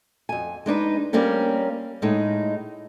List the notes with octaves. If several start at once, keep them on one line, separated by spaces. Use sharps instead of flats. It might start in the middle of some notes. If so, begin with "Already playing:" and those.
F2 G#5
G#3 D4 D#4 B4
G3 A#3 C4 C#4 A#4
A2 G#3 D#4